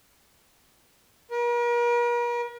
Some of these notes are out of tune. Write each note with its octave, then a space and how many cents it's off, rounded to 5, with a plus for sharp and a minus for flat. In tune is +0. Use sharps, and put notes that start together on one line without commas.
A#4 +45